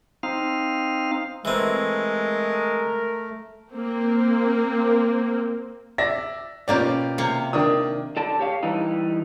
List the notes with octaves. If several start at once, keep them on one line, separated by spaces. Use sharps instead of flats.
C4 D#4 F5
E3 G#3 A3 C4 A#4
A#3 C4
D5 E5 A#6
B2 A#3 C#4 F4 G4 D5
C3 A#3
D#3 D4 D#6
A4 D5 A5
G4 C#5 F5
E3 G3 D#4